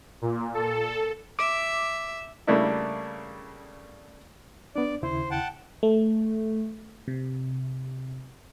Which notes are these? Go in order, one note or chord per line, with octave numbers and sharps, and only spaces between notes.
A#2
A4
E5 D6
C#3 G3 A3 A#3 D4 E4
B3 D4 D5
D#2 C#3 E4 C5
F#5 G5 A5
A3
C3